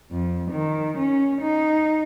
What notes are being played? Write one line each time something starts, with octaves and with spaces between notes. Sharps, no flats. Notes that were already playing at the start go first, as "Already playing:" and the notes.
F2
D#3
C#4
D#4